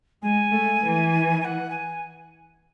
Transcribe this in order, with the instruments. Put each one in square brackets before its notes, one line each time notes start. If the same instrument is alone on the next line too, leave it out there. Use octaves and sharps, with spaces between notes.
[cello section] G#3 [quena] G#5
[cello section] A3
E3
[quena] G#5
F#5
G#5